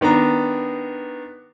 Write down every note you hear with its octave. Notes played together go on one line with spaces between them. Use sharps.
D#3 B3 D4 A#5